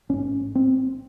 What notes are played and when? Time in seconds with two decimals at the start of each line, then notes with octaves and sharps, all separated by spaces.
0.09 A1 G#2 C#4
0.55 C4